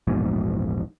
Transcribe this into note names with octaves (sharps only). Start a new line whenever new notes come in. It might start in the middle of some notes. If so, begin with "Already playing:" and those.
E1 A#1 G#2 B2